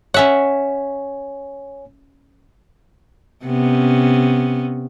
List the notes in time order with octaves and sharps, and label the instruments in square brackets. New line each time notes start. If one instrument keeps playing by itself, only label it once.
[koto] C#4 E5 F#5 [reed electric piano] C#5 G#5
[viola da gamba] C3 B3 C#4